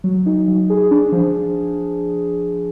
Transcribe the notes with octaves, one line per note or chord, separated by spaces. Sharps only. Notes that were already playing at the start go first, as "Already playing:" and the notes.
F#3
D#4
F#3
G#4
D4
F3